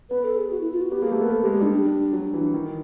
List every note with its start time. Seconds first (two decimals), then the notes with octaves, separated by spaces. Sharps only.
0.10 B3 B4
0.24 A4
0.37 G#4
0.51 F#4
0.61 E4
0.71 F4
0.81 F#4
0.92 B3 G4
1.02 A#3 G#4
1.12 A3 G4
1.21 B3 A#4
1.32 A4
1.42 G4
1.45 G#3
1.52 G4
1.60 G3 D4
1.73 D4
2.13 F#3
2.34 E3
2.54 D#3